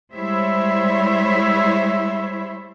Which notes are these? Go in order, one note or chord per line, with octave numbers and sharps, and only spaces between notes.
G3 G#3 E4 C5 C#5 E5